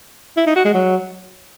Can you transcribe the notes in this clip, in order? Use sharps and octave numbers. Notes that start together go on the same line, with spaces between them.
E4
D#4
F#4
G#3
F#3